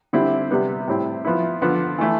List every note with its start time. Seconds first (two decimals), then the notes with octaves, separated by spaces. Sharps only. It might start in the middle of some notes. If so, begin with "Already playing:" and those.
0.13 D3 G3 C4 E4
0.51 C3 G3 B3
0.88 A2 G3 C4 E4
1.25 F3 B3 E4
1.62 D3 F3 B3
1.98 E3 A3 E4